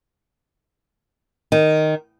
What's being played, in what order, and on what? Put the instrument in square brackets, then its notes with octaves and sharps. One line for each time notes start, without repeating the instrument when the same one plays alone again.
[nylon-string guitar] D#3